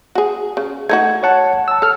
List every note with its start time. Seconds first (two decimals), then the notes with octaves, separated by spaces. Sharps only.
0.15 F#4 G#4
0.57 C#3
0.89 A3 D#4 F#4 G#6
1.23 C#5 F#5 A5
1.68 A5 E6
1.82 A4 E6 F6